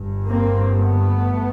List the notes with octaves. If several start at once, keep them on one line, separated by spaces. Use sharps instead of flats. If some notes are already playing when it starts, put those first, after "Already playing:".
Already playing: G1 G2
A#3 C4
A3 B3